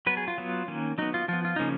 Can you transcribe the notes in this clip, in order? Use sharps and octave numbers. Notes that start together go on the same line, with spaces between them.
F#3 B3 B4
G#4
F4
F#3 B3
D#3 A#3 C#4
F#3 B3 D#4
F4
F3 B3 F4
F4
C#3 F3 A#3 C#4 D#4